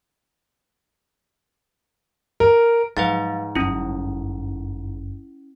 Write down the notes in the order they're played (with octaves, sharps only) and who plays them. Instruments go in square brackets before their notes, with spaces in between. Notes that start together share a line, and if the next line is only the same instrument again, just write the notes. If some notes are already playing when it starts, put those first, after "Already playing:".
[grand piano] A#4
[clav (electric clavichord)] G#2 [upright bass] F3 F#3 [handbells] B4 F5 A6
[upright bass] G1 F#2 [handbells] C#4 E4